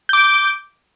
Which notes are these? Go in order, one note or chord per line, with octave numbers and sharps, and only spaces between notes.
D6 G6 D7